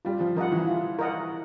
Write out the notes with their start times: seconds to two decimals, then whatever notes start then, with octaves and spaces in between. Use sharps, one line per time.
0.05 G3 F4
0.20 F3
0.36 F3 A#4 D#5 F#5
0.52 E3
0.67 F4
0.99 A#4 D#5 F#5